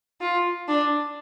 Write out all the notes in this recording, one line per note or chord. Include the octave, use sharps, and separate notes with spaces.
F4
D4